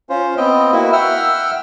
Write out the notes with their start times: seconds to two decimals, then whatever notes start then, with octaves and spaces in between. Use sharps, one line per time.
0.09 C#4 F4 C5
0.37 B3 C4 D#5 G5
0.72 A#3 E4 F#4
0.93 E5 F#5 G5 E6 F6